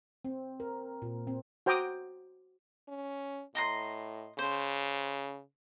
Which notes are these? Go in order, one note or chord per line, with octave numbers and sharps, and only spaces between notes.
C4
A#4
A#2
C4
F#4 C5 G5 A#5 D6 D#6
C#4
A2 D#5 A#5 C6
C#3 C5